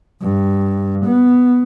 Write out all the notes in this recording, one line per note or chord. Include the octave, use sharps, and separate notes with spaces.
G2
B3